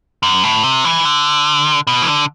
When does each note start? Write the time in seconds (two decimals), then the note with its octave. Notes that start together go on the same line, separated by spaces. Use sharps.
0.23 F#2
0.43 A2
0.63 C3
0.84 E3
1.05 D3
1.87 B2
2.02 E3
2.08 D3